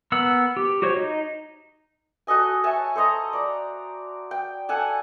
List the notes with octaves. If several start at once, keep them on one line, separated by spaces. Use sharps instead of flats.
B3 A#4 F#5 E6
G4
F#4 G4 C5 C#5
D#4
F#4 A4 D#5 G#5
C#5 E5 G#5 A5
A4 C5 D#5 A#5
D5 A#5
G5
A4 F#5 G#5 A5